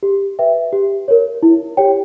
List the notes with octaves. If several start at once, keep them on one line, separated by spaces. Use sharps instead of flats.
G4
B4 E5 G5
G4
A#4 C#5
E4
G4 C#5 G5